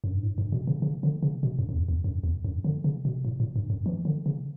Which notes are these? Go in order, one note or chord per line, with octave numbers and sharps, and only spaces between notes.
F#2
G2
A2
G2
B2
C#3
C#3
D3
C#3
B2
F#2
F#2
E2
E2
F#2
E2
F#2
D3
C#3
B2
A2
A2
G2
F#2
E3
D3
C#3